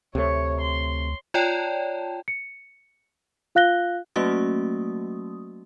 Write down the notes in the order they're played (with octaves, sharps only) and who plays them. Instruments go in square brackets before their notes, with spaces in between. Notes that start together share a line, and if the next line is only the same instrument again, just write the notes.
[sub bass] D2 [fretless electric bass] C3 A3 [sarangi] C#5
[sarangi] C6
[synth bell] F4 C#5 D5 G5 A5
[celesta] C#7
F4 F5 F#6 A#6 G7
[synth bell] F#3 A3 A#3 C#4 F#4 D#6